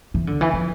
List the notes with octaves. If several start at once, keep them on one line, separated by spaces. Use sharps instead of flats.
E3
D3
E3
F3